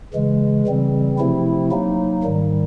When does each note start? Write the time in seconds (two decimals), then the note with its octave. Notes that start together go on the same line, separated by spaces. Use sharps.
0.13 C#3 E3 G#3
0.67 C#3 E3 G3 C4
1.18 C3 F3 A3 C4 E4
1.71 F#3 A#3 D#4
2.23 G#2 D#3 G3